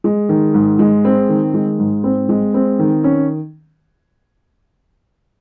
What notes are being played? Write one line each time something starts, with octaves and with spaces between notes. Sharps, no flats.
G#3
D#3
G#2
G#3
C4
D#3
G#3
G#2
C4
G#3
C4
D#3
C#4